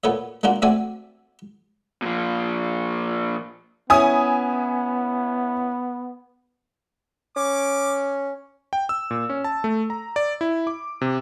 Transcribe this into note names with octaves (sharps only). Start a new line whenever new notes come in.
A#2 B3 A4 C#5 E5
G#3 A#3 D4 F4 F#4
A3 C4 F#4 D5 E5 G#5
A#2 F3
B3 C#4 E4 G#5 D#6
C#4 D6
G5
E6
A#2
C#4
A5
A3
A#5
D5
E4
D6
C3